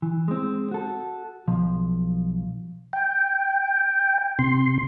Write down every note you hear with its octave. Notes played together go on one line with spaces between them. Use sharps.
E3
G#3 C4
F#4 A4
B1 F3
G5
C3 C6